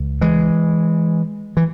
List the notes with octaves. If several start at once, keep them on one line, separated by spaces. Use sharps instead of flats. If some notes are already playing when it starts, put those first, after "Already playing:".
Already playing: C#2
E3 G#3
E3